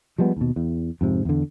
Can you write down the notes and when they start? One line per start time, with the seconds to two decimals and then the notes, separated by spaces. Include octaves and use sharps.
0.18 F3 G3 G#3 B3
0.36 D#2 B2
0.56 E2
1.01 F2 G#2 C3
1.25 E2 D3